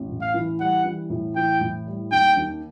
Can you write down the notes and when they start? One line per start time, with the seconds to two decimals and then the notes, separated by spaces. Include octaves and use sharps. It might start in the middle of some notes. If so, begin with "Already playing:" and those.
Already playing: A1
0.09 A2
0.22 F5
0.34 E3
0.60 G3 F#5
0.85 E3
1.10 A2
1.36 E3 G5
1.61 A2
1.87 G3
2.12 D#2 G5
2.37 D#2